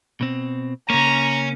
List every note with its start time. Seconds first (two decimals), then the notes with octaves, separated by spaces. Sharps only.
0.21 B2 C4
0.90 C#3 A#3 C#4 A#5